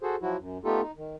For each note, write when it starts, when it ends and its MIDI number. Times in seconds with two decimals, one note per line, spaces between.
0.01 0.16 66
0.01 0.16 68
0.01 0.16 69
0.01 0.16 72
0.22 0.37 53
0.22 0.37 54
0.22 0.37 64
0.22 0.37 66
0.39 0.58 42
0.65 0.81 57
0.65 0.81 59
0.65 0.81 63
0.65 0.81 65
0.65 0.81 67
0.65 0.81 69
0.82 0.91 63
0.96 1.16 51